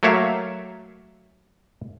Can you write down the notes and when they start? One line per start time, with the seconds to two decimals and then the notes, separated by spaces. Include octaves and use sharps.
0.03 F#3 A3 A#3 C#5 E5 F5